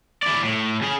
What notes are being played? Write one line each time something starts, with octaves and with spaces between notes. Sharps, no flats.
E4 D5
A2
C#3 G#4